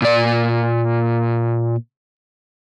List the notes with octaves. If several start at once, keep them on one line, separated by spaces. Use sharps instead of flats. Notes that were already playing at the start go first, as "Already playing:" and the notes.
A#2 D5